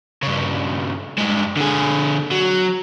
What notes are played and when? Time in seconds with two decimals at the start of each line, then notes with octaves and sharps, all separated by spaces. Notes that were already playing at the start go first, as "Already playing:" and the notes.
0.23 G2 C#3
1.18 G2 G#3
1.57 D3 G#4
2.31 F#3